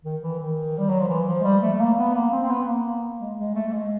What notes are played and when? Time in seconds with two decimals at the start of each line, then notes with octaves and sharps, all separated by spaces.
0.04 D#3
0.22 E3
0.39 D#3
0.78 G3
0.89 F#3
1.00 F3
1.09 E3
1.27 F3
1.41 G#3
1.44 G3
1.62 A3
1.73 A3
1.79 A#3
1.98 B3
2.14 A#3
2.32 C4
2.43 C4
2.50 B3
2.67 A#3
3.20 G#3
3.38 G#3
3.55 A3
3.68 A3
3.72 G#3